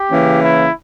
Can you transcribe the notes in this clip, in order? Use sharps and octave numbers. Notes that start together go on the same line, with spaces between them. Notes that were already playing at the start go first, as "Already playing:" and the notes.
Already playing: G4
C#3 E3 A#3 C#4
E4